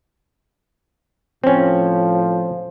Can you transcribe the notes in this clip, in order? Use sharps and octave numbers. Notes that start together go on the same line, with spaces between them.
A2 F3 C4 C#4